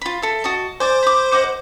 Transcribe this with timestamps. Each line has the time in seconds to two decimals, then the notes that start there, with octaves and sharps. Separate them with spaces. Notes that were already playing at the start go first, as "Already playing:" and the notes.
0.01 F4 B5
0.22 A4 E5
0.44 F#4 D#5 A5
0.80 C5 D5 G#5
1.03 B5 D6
1.32 D#5 F#5 D6